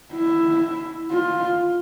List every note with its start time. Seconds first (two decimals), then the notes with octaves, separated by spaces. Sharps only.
0.15 E4
1.11 F4